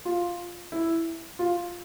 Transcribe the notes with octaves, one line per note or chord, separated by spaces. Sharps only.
F4
E4
F4